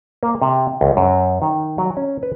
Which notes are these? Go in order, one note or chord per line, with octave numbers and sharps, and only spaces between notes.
A#3
C3
C#2
F#2
D#3
F#3
C#4
B4